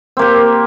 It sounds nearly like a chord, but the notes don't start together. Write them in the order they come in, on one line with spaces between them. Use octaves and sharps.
C4 A#3 G4